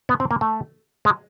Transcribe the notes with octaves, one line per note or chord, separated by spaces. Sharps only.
B3
C4
A#3
A3
G#3